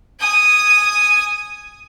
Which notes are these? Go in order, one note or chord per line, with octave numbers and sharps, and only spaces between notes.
G#5 D#6